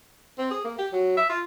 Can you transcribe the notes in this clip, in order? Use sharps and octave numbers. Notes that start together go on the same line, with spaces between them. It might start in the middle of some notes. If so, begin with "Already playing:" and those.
C4
G#4
A#3
G4
F#3
E5
F4